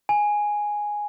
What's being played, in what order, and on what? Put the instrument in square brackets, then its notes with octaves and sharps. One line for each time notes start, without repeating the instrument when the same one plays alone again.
[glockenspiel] G#5